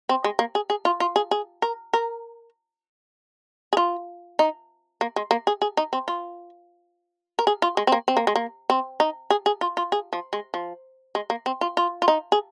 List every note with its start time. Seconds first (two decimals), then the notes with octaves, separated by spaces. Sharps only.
0.09 C4
0.24 G#3
0.39 A#3
0.55 G#4
0.70 G#4
0.85 F4
1.00 F4
1.16 G#4
1.31 G#4
1.62 A#4
1.93 A#4
3.73 G#4
3.77 F4
4.39 D#4
5.01 A#3
5.16 G#3
5.31 A#3
5.47 G#4
5.62 G#4
5.77 D#4
5.93 C4
6.08 F4
7.39 A#4
7.47 G#4
7.62 F4
7.77 G#3
7.87 C4
7.92 A#3
8.08 C4
8.17 A#3
8.27 G#3
8.36 A#3
8.70 C4
9.00 D#4
9.30 G#4
9.46 G#4
9.61 F4
9.77 F4
9.92 G#4
10.13 F3
10.33 G#3
10.54 F3
11.15 G#3
11.30 A#3
11.46 C4
11.61 F4
11.77 F4
12.02 F4
12.08 D#4
12.32 G#4